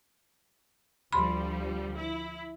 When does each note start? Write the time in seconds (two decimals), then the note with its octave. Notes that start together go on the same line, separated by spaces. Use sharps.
1.13 D2 F3 G3 B5 C6
1.98 E4